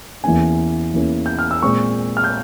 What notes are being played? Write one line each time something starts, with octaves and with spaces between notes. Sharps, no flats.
E2 E3 A#3 C#4 G#5
E2 E3 A#3 C#4
G6
F6
E6
A#2 G#3 C4 C#6
F6
G6